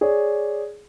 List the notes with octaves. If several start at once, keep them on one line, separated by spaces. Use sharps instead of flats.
G#4 C#5 D5